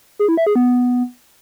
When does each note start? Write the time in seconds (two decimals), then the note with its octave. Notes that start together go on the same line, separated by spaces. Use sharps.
0.19 G#4
0.28 E4
0.37 E5
0.46 G#4
0.56 B3